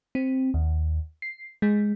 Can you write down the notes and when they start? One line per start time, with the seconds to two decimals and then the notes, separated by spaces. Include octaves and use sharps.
0.15 C4
0.54 D#2
1.22 C7
1.62 G#3